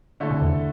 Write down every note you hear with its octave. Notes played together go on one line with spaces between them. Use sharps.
D3 A3 E4 A4
C3
E2